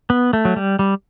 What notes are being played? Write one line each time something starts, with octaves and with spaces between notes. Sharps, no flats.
B3
A3
F#3
G3
G3